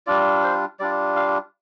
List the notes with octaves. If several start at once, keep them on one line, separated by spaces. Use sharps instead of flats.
G3 D4 F4 D5
C5
G3 D4 F4 D5
F5